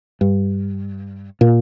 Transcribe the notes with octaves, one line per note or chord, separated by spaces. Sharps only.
G2
A#2